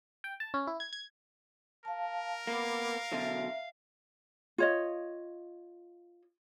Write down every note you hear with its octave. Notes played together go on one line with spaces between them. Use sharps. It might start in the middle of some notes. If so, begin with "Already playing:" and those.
G5
A5
C#4
E4
G#6
G#6
A#4 F5 A5
A#3 B3 F5 B5 D6
B2 D3 F#3 E5
F4 C#5 D#5